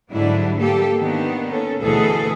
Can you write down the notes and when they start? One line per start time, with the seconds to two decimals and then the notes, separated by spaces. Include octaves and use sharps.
0.11 G#2 D3 F#3 G3 D4 E4
0.59 G3 A#3 G4 A4
1.01 D#3 A#3 B3 D4
1.50 C#4 A4
1.81 D2 B2 E3 A3 G#4 A4